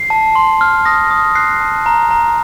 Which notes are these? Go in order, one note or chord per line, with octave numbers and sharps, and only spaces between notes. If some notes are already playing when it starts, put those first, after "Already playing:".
Already playing: C7
A5
C6
F6
D#6 A#6
D#6
F#6 C7
A5
A#5
A#5